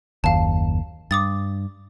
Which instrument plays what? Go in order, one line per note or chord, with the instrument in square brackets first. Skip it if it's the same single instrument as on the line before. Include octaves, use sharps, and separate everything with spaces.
[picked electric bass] F#1 D#2 [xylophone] F5 A5
[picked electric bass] G2 [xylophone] D6 D#6 A6